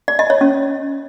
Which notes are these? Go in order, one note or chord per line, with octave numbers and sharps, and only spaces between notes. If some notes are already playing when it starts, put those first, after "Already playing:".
D5
D#5
C#5
C#4